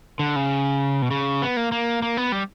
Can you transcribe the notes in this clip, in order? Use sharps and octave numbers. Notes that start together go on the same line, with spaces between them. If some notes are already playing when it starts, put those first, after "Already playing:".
D3
C#3
B2
C#3
B3
A#3
A#3
A#3
B3
G3